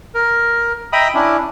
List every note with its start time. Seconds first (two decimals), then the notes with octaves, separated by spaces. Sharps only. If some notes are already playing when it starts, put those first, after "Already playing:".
0.15 A#4
0.93 D#5 E5 G5 A#5 B5 D#6
1.14 C#4 D4 E4